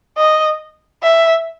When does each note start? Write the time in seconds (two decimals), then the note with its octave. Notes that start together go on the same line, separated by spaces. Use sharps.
0.17 D#5
1.03 E5